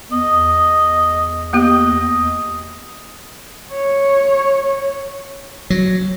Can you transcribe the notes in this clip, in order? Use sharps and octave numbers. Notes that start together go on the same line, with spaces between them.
E2 D#5
A#3 B3 G4 D#5
C#5
F#3